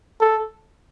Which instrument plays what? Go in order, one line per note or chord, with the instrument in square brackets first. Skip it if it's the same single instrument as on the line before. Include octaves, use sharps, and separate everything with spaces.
[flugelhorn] A4